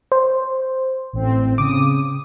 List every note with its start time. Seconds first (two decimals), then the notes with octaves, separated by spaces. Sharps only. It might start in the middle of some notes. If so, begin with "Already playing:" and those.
0.12 C5
1.13 A1 C4
1.58 C#3 D6 D#6